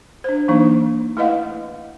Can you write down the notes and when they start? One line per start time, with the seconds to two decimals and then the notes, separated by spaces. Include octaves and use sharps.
0.24 D4 C5
0.48 E3 F#3 A#3 D4 D#4
1.17 A3 E4 B4 D#5 F5 F#5